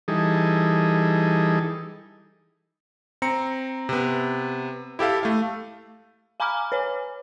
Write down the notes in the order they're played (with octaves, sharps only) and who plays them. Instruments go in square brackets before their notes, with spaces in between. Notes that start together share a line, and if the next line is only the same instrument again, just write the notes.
[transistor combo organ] E3 G3 D#4 G#4 A4
[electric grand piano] C4 A#5 C#7
C3 B3
E4 G4 A4 F5
A3 F5
[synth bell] F5 G#5 A#5 B5 D6 F6
B4 C#5 G#5